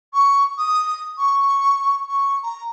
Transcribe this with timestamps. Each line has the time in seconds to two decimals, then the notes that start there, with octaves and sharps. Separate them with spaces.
0.14 C#6
0.58 D#6
1.18 C#6
2.09 C#6
2.43 A#5